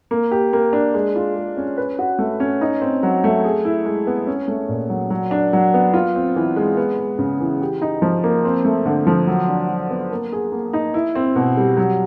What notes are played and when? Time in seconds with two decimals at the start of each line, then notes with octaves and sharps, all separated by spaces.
0.11 A#3
0.31 G4
0.53 A#3
0.73 D4
0.94 G#3
1.16 F4
1.35 G#3
1.57 C#4
1.77 B4
1.99 F#4
2.19 A3
2.40 C#4
2.61 D#4
2.81 C4
3.03 F#3
3.24 A3
3.44 G#4
3.65 E4
3.85 G#3
4.07 B3
4.27 C#4
4.48 A3
4.69 A#2
4.89 F#3
5.10 F#3
5.31 D4
5.53 F#3
5.74 B3
5.94 F4
6.15 C4
6.36 E3
6.56 G#3
6.77 B3
6.99 G#3
7.19 C#3
7.40 E3
7.61 G4
7.82 D#4
8.02 F3
8.24 A#3
8.45 C4
8.65 A3
8.86 D3
9.07 F3
9.27 F#3
9.48 D4
9.69 F#3
9.90 B3
10.11 A#3
10.32 G#4
10.52 A#3
10.73 D#4
10.94 E4
11.15 C4
11.36 B2
11.57 G3
11.77 F#3